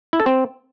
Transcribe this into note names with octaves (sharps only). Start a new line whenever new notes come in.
E4
A4
C4